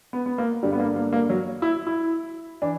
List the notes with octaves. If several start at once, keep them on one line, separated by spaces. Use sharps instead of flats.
B3
B3
A#3
G2 D3 G3
B3
A#3
A#3
A#3
F#3
E4
E4
E3 D4